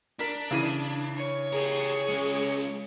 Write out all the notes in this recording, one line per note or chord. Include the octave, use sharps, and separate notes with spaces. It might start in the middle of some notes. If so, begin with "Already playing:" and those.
D4 A#4 B6
C#3 E3 D#7
C#5
G4 G#4 A#4
G#3 C#4